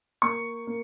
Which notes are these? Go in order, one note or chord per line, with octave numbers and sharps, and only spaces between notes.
A#3 C#6
A#3